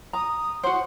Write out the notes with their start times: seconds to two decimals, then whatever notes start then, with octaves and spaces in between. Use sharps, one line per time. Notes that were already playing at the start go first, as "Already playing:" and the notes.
0.13 A#5 D#6
0.63 F#4 C5 F#5